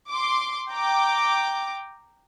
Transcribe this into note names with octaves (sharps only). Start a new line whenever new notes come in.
C6 D6
G5 A#5 D6